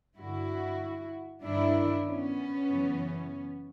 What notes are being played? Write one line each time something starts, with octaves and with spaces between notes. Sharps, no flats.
G2 D3 E4 F#4
G2 D#3 D4 E4
B3 C#4
F#2 C#3 E3